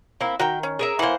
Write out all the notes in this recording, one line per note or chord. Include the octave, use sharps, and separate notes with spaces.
A#3 C4 E4
D#3 F#4 A#4 G5
C#4
G#4 A#4 E5
E3 A#3 C5 F#5